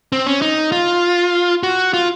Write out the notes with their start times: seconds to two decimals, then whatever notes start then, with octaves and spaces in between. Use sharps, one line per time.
0.12 C4
0.27 C#4
0.42 D#4
0.72 F4
1.63 F#4
1.94 F4